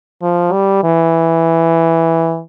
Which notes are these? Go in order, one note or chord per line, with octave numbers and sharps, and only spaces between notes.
F3
G3
E3